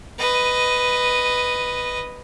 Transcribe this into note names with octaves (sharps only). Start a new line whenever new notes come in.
B4 D#5